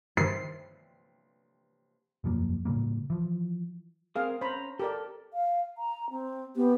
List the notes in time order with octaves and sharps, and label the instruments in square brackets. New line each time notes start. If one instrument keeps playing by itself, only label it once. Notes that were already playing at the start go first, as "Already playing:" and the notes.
[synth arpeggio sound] G2 D#3 [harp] C7
[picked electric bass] E1 F#2 F3 A#3
A2 C#3 G3 A#3
E3 F3
[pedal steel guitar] C4 A#4 D#6 [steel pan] G#4 F5
[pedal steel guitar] C#4 A#5 [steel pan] C5 B5
[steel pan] G4 A#4 D5 [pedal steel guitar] A4
[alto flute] F5
A#5
C4
[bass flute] B3 [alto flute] G4